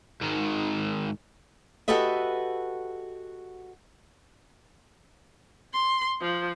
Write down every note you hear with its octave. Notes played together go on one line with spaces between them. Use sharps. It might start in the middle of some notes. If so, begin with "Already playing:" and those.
G#2 D#3
F#4 G4 A4 B4 D#5 E5
C6
F3